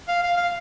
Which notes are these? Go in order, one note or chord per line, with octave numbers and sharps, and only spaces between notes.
F5
F5
F5